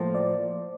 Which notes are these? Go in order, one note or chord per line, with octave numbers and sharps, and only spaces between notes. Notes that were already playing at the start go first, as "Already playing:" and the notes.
Already playing: A2 F3 A#3 F4 A4 C5
D5